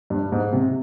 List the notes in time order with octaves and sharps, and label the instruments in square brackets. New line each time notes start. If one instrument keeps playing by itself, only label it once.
[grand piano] G2
G#2
C3